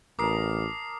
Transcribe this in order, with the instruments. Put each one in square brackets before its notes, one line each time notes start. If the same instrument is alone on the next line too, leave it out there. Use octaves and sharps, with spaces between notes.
[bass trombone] A1 [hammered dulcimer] A#4 A5 [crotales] D6 D#6 C7